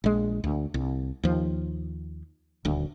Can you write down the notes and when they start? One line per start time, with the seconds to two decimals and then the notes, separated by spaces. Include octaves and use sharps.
0.04 A#1 G#3
0.44 D2
0.74 C2
1.23 D#2 F3
2.65 D#1 D2